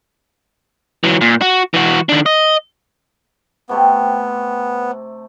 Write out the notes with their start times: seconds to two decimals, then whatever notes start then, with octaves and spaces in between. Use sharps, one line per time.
1.04 E3 F#3
1.21 A#2
1.42 F#4
1.74 E3 F#4
2.09 D#3 D4
2.26 D#5
3.69 C3 A3 B3 C4